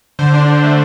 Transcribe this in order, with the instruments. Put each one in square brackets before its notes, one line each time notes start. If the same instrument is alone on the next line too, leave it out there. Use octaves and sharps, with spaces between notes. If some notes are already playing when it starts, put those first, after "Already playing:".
[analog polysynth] D3 C5
D4
D3
A3